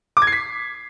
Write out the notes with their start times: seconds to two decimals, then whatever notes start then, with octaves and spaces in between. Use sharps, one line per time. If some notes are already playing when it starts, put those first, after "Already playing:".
0.17 D6
0.22 G#6
0.27 C7
0.32 B6